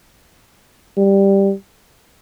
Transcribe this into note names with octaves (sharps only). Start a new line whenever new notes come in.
G3